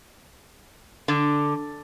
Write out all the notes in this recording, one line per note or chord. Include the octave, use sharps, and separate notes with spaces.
D3